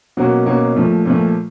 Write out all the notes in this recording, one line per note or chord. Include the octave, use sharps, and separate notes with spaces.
B2 F#3 A#3 C#4 F#4
B2 F#3 A#3 C#4 F#4
A#2 F3 A3
A#2 F3 A3